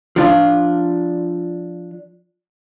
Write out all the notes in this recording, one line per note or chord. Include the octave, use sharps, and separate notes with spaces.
F3 D4 F4